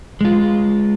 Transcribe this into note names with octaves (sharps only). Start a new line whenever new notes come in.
G#3 F4